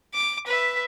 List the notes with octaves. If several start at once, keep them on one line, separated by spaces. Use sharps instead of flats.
D6
B4 E5